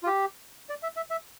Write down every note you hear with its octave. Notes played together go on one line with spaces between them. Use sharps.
F4
G4
D5
E5
E5
E5